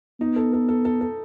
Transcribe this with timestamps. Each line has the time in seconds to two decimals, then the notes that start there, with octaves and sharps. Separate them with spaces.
0.20 B3 D#4
0.36 A4
0.53 A4
0.69 A4
0.85 A4
1.01 A4